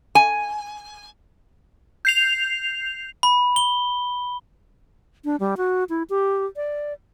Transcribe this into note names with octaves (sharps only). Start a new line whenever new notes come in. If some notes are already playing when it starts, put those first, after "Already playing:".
G#5
G6 C7 F7
B5
G7
D4
G3
F#4
E4
G4
D5